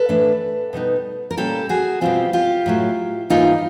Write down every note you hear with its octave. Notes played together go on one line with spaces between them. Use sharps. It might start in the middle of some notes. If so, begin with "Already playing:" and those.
Already playing: A4 B4
A2 E3 A3 D4
B2 G3 B3 D#4
A#4
A#2 G3 A#3 C#4 G4 A4
F#4 G#4
B2 G3 C4 F4 G4
F4 G4
A2 F#3 A3
G#2 E3 G3 A#3 D#4 F4